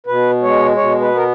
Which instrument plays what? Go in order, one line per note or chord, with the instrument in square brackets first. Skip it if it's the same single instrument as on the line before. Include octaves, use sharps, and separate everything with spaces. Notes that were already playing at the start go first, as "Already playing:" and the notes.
[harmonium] B2 B4
G#3 C#5
B2 C#5
B4
B3 A#4